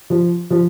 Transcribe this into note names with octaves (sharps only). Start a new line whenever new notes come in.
F3
F3